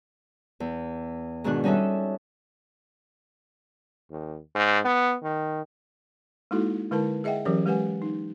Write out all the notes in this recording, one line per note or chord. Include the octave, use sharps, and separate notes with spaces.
E2
G#2 B2 D#3 D4 F#4 F#6
G3 C#4 D#4 A4 E5
D#2
G#2
B3
D#3
G#3 A#3 D#4 E4 F#4 A4
D3 G#3 E4 A#4 B4 A5
G#4 D#5 E5 F#5 G5
E3 F#3 C#4 G4 A#4 D5
G#3 G4 B4 F#5 G#5
D#4